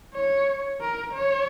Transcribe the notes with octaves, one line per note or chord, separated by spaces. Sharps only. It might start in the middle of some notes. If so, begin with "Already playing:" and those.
C#5
A#4
C#5